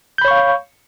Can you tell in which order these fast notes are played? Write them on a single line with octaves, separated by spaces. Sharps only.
G6 B5 C#5 C#6 F5